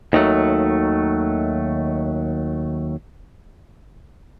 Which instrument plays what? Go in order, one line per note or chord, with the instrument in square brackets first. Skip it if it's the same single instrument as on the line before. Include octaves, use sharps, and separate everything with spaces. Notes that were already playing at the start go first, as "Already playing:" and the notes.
[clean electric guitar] D#2 D#3 F#3 A3